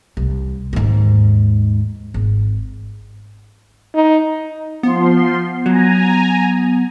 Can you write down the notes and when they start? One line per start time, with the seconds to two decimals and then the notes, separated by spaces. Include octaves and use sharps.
0.17 C2
0.73 D#2 G#2
2.14 G#1
3.95 D#4
4.83 F3 B3 C6
5.66 F#3 G#5 A#5